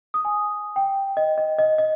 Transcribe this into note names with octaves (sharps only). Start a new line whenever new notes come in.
D#6
G#5
G5
D#5
D#5
D#5
D#5